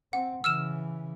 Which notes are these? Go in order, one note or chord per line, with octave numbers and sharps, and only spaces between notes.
C4 F#5
C#3 E3 E6 F6 E7